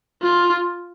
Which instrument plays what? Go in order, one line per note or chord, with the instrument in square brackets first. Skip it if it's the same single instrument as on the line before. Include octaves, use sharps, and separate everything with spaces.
[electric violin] F4